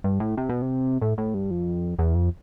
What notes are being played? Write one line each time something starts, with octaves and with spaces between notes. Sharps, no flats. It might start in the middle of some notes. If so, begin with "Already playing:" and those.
G2
A2
C3
B2
C3
A2
A2
G2
F2
E2
F2